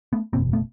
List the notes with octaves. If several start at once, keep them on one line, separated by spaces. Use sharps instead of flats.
A3 B3
F#1 E2 B2 A#3 C4
A3 B3